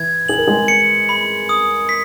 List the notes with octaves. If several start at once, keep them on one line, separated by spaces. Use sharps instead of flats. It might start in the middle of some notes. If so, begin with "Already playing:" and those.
Already playing: E3 E4 G#6
G#4 F#7
A#4
G#3 G#4
C#7
B5
D#6
B6